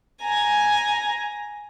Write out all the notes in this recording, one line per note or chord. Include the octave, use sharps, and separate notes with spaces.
G#5 A#5